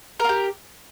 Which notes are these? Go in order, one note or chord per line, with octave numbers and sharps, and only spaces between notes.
F4 G4 A#4